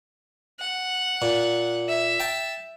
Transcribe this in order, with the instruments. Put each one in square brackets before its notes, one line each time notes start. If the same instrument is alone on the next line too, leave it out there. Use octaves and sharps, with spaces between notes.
[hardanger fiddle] F#5
[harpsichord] A#2
[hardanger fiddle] E5
[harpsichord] G5 A5